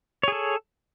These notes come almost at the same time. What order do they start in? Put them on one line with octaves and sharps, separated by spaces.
C#5 G#4 A4